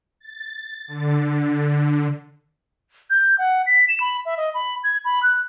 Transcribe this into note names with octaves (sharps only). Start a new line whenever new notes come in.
A6
D3
G6
F#5
B6
E7
B5
E5
D#5
B5
G#6
B5
F#6